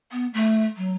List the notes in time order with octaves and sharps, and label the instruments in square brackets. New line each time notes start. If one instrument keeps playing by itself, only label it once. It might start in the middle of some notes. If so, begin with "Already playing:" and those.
[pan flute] B3
A3
F#3